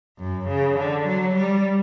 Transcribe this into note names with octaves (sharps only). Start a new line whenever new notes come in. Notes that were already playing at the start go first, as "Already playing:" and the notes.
F#2
C#3
D3
F#3
G3